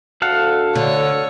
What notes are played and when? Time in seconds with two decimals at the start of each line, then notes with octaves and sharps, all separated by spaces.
0.22 D2 A4 F5 F#5
0.75 D3 C#5